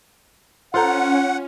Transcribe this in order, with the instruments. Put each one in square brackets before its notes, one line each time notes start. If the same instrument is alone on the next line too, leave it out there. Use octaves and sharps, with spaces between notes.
[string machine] C#4 [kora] F4 [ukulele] A4 C5 A#5 [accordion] F#5